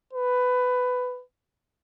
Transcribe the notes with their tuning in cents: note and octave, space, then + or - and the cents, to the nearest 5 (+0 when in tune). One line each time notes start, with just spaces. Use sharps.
B4 +15